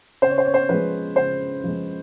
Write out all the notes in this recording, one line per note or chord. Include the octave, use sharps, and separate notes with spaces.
C#3 C5
C#5
C5
C#5
C5
F3 G#3 B4
C#3 C5
F3 G#3